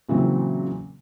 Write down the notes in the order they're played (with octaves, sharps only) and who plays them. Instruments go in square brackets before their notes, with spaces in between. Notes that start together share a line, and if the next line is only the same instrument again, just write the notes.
[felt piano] A#2 C#3 E3 F#3 A#3 C4